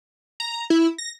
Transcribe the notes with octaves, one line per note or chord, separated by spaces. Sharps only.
A#5
E4
A#6